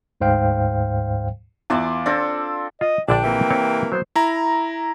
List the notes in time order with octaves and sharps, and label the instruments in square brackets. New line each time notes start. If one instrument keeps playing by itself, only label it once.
[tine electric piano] D2 G#2 C5 F5 G5
[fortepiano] E2 [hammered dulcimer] F4 D5 G#5
[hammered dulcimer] C4 A4 [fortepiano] D4
[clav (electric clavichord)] F4 [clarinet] D#5
[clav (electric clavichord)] A#1 D3 D5 [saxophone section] D4 [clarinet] G5
[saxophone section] C3 E3 A#3
[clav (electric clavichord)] C4 C#5
[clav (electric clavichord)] F#3 B3 [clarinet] C5
[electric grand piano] E4 A#5